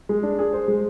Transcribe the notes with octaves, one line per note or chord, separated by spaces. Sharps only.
G#3
D4
G#4
C5
G#3